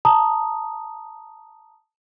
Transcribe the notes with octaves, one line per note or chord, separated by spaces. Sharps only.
A5 A#5 D#6